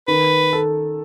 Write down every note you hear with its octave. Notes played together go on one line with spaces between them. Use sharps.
D#3 B4
A4